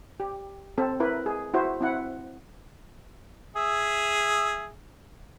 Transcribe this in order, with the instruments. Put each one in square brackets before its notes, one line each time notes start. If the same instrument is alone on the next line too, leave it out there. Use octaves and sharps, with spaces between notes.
[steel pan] G4
C4 A4
E4 A#4 B4
G#4
E4 F#4 C5
C4 E4 F#5
[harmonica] G#4 E5